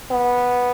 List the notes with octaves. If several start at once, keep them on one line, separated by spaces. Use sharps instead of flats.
B3